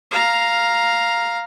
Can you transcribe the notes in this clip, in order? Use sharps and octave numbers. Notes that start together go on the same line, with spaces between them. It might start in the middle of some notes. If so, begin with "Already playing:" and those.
F5 A#5